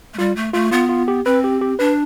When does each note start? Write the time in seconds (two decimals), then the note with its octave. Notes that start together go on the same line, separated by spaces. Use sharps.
0.14 A3
0.18 G3 F4
0.36 A3
0.54 A3 F4
0.71 B3 F4
0.89 F4
1.08 G4
1.25 C4 B4
1.44 G4
1.61 G4
1.79 D4 B4